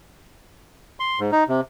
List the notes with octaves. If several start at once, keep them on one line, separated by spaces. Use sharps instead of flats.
C6
G#2
D#4
C3